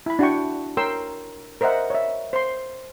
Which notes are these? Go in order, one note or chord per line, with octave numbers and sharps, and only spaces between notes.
E4 B5
D4 F#4 F#5 G5 C#6
A#4 C#5 G5 C6 E6
A#4 C5 D#5 E5 F#5
C#5 E5
C5 C6